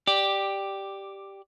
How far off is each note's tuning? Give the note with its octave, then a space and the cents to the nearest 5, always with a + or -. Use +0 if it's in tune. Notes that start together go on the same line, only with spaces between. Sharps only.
G4 +0 D5 +10